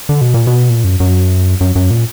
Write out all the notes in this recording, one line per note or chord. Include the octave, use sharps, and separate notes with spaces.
D3
B2
A#2
B2
A#2
F#2
F#2
F#2
F#2
A#2